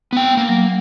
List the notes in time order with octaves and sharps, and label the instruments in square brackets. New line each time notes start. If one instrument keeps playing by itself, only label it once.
[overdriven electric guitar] B3 G5
A#3
[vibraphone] F#3